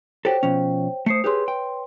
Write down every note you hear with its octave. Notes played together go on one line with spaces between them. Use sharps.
F#4 G4 A4 C5 C#5 G5
B2 F3 C#4
A3 C5 D#6 C7 C#7
G4 G#4 B4 C#5 C6
G5